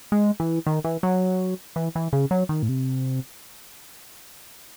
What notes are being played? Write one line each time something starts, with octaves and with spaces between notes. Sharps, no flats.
G#3
E3
D#3
E3
F#3
E3
E3
C#3
F#3
D#3
A2
C3